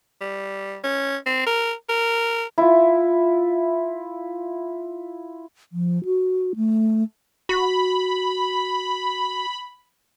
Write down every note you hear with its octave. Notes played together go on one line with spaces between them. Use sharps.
G3
C#4
C4
A#4
A#4
E4 F4
F3
F#4
A3
F#4 B5